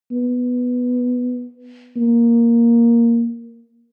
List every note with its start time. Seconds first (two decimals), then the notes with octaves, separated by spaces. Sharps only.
0.11 B3
1.96 A#3